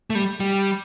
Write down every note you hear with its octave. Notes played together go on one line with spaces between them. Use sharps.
A3
G3
G3